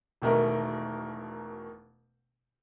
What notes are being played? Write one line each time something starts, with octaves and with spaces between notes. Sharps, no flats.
E1 B2 D#3 A3 A#4